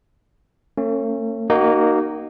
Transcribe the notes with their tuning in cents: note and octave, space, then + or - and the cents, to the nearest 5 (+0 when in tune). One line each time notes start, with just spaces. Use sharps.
A3 +45 C#4 -25
A#3 +0 D#4 -15 F#4 +30